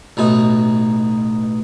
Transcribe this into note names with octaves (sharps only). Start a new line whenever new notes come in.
A1 B2 D#4